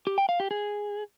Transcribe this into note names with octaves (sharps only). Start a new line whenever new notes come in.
G4
G5
F5
G4
G#4